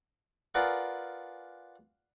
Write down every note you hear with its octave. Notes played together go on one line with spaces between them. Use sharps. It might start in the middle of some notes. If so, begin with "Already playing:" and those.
F4 G#4 A#4 B4 D5 F#5